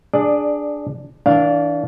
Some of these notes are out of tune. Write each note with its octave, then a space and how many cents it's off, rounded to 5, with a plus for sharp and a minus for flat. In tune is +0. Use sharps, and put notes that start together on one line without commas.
D4 +0 G#4 +0 D5 +15
E3 -35 D4 -15 F5 +0